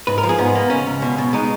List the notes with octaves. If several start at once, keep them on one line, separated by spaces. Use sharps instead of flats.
G#2 B4
A#4
F3
G#4
G#2 B3
A#3
C#2 C#4
C#2
B2
B2
G#3 D#4